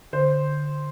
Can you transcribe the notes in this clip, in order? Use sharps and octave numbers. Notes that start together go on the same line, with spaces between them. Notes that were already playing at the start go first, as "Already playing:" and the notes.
D3 C5